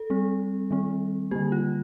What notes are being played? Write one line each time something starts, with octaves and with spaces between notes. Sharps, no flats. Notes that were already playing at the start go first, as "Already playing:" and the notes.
Already playing: A4
G3 C4
D#3 G3 C4
D3 G3 A#3 G4
F4